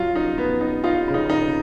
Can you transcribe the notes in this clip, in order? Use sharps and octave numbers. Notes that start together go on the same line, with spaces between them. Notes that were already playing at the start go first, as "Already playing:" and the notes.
Already playing: F#3 F4
D#4
B3
D#4
D#4 F4
C#3
D#4
D#4